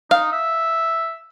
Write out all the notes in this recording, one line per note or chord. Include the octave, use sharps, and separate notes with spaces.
D#4 F5
E5